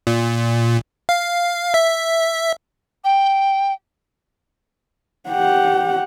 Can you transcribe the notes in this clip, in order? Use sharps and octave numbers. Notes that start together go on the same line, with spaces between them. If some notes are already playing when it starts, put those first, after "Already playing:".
A#2
F5
E5
G5
G4 F#5